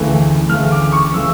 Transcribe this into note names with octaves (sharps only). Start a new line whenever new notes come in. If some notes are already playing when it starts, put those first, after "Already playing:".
Already playing: D2 C#3 E3 A3
D2 C#3 E3 A3 F6
D6
C#6
C#3 E3 A3 E6